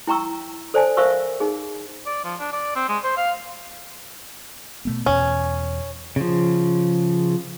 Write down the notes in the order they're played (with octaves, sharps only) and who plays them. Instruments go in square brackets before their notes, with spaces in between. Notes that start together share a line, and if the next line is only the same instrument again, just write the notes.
[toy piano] E4 G5 A#5 C#6 E6
A4 C5 D5 G#5 A5
A#4 C5 E5 F5 C#6 E6
D#4 G#4
[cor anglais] D5
F3
D4
D5
C4
G#3
C5
F5
[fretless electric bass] B2 A3 B3
[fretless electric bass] E2 B2 [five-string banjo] C#4
[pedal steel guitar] C#3 F3